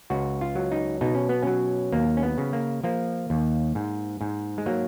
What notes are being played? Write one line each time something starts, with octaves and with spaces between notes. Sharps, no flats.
C#2 F#4
F4
F#3
D#4
B2 D#4
C#4
B3
F#3 C#4
D#2 A#3
C#4
B3
C#3
A#3
F3 A#3
D#2
G#2
G#2
G#3
F#3 A#3